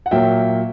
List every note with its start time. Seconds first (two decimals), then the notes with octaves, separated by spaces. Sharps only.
0.06 F#5
0.11 A#2 F#3 A#3 E5 G5